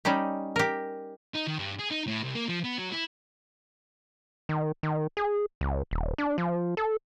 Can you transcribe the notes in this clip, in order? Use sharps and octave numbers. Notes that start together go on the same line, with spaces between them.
G3 C#4 D#4 G4
G4 A#4
D#4
D#3
G2
G#4
D#4
A2
C2
A#3
F3
B3
F#3
E4
D#3
D#3
G#4
C#2
D#1
D4
F3
A4